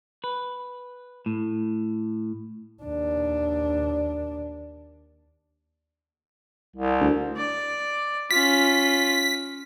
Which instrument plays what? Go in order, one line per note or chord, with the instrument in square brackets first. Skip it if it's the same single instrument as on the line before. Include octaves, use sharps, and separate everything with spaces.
[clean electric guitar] B4
A2
[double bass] D#2 D4
[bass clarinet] C2
[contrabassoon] D2
[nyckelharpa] D5
[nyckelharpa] C#4 F4 [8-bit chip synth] B6